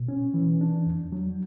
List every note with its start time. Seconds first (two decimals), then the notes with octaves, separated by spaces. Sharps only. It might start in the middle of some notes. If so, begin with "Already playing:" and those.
Already playing: B2
0.08 C#4
0.34 E3
0.61 D4
0.86 E2
1.12 F#3